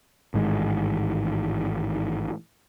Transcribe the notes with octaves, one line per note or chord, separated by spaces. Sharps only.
A1 G#2 D#3 G#3